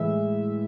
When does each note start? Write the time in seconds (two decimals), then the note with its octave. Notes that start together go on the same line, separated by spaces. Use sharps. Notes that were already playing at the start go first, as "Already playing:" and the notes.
Already playing: A2 E3 G#3 E5